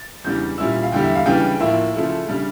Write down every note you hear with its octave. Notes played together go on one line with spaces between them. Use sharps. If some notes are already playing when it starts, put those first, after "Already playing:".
Already playing: A6
E2 C#3 G3 D4 G6
A#2 G3 C#4 E4 E6
F5
E2 D3 G3 G5
E5
F5
C#3 E3 G3 D4 G5
A2 F3 A#3 E5
C#3 F3 A3 E4
C#3 G3 D4